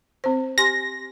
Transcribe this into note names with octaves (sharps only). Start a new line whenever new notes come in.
C4 C5
G4 G#5 C6 A#6